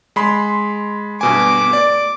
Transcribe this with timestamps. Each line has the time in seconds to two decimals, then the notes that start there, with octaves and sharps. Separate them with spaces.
0.16 G#3 B5 C6
1.21 G2 B2 G#5 D6
1.73 D5